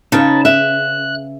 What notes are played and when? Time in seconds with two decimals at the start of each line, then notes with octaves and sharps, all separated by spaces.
0.12 C#3 D#4 B4 C#5 A5
0.45 E5 F#6